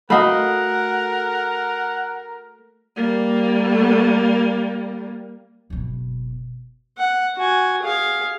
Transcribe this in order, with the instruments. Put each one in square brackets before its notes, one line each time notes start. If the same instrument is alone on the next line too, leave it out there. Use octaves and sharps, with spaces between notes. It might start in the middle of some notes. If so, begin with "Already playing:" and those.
[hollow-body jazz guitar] A3 F#4 [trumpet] A#4 [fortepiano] D#5 F5 B5 [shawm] F#5
[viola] G3 A#3
[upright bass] F#1 B2
[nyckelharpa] F#5
F#4 G#5
G#4 F5